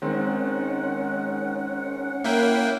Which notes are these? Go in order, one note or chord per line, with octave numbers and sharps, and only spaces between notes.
D#3 G#3 C4 C#4 F#5
A#3 E4 G5